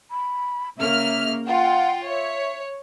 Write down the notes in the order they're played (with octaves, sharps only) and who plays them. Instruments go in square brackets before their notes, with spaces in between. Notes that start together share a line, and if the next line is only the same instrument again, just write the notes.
[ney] B5
[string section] C#3 A#3 F6 [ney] E5
[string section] F4 G5 [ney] F#5
[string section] C#5 [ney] E5